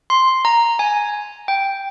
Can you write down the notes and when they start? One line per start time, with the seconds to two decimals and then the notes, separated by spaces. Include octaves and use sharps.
0.10 C6
0.45 A#5
0.79 G#5
1.48 G5